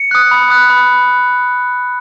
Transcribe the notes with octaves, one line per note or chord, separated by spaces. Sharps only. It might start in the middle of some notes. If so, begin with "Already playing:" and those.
Already playing: C#7
D#6 F#6
B5
D#6 F#6
B5